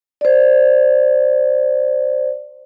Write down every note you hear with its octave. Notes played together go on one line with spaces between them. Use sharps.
C5 D5